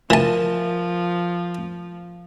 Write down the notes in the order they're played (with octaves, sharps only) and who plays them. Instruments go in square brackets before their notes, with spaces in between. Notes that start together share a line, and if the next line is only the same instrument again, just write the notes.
[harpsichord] E3 A5 [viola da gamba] F3 [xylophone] A#4 D#7